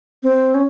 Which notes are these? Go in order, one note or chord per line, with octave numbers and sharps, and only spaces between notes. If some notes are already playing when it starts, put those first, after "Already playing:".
C4
C#4